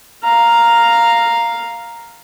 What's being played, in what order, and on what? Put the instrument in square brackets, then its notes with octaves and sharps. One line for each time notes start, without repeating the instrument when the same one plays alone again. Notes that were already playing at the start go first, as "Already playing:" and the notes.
[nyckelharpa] F5 A#5